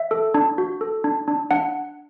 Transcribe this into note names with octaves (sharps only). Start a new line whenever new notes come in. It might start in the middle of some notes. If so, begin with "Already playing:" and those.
Already playing: E5
A4
D4
F#4
A4
D4
D4
D4 F#5